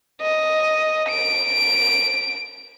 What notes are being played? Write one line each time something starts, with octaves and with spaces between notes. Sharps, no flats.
D#5
D7